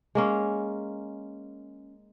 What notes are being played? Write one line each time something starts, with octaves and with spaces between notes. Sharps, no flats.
G#3 A#3 C#4